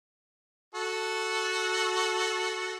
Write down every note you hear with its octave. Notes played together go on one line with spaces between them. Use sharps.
F#4 A4